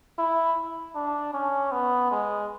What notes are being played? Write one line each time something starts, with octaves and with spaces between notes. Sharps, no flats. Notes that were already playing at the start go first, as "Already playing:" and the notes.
E4
D4
C#4
B3
G#3